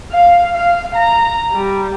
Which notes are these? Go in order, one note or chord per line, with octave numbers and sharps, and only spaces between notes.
F5
F5
A#5
G3